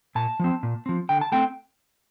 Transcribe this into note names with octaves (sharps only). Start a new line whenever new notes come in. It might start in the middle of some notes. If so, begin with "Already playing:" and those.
A#2 A5
F3 C4
A#2
F3 C4
D3 G5
A5
A3 C4 G5